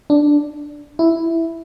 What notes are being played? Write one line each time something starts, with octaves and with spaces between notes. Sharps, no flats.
D4
E4